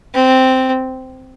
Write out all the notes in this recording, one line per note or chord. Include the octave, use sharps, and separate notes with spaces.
C4